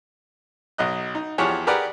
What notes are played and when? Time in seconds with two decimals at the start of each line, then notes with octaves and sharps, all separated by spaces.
0.78 B1 F#3 D#5 F#6
1.15 D#4
1.38 E2 F3 G4 G#4 C#5 F#5
1.67 G4 G#4 A#4 B4 D5 F#5